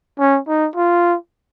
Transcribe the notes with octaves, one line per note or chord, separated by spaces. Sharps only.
C#4
D#4
F4